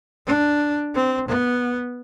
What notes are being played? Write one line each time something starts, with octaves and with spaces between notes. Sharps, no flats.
D4
C4
B3